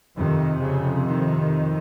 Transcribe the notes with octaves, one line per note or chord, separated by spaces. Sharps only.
F2 C3 D#3
C#3
D#3